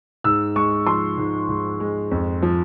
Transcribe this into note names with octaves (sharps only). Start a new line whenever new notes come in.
G#2 E6
G#3 C#6
F3 C6
G#2
G#2
G#3
F2
F3